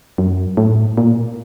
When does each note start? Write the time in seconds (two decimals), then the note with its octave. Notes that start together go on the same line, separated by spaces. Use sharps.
0.18 F#2
0.57 A2
0.97 A#2